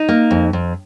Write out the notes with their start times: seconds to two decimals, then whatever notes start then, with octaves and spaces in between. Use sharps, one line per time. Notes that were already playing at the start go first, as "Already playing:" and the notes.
Already playing: D#4
0.09 A#3
0.31 F2
0.53 F2